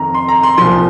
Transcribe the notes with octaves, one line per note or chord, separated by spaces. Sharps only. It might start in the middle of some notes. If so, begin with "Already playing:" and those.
Already playing: F2 D#3 A#5
C6
A#5
C6
C2 A#2 F3 C6